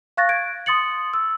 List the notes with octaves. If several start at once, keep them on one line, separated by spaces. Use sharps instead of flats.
F5 C#6 F#6 A6 A#6
G#6 D7
C6 D#6 A6 C#7 F#7
E6